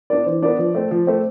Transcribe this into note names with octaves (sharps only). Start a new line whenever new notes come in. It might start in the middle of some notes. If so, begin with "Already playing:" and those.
B3 D4 D5
E3 C5
B3 D4 D5
F3
A3 C4
F3
A3 C4